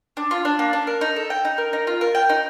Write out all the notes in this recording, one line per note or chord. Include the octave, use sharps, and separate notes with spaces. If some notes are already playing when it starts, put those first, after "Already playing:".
D4
F4
D4
A#3
D4
A#4
D#4
A4
G5
D#4
A#4
D#4
F4
A#4
G5
D#4